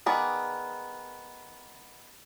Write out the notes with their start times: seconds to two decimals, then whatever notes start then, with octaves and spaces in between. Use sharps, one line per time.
0.06 D#3 B3 G#4 D5